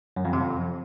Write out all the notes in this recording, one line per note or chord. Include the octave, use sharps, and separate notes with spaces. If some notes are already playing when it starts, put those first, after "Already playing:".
F#2
F2
C3
F2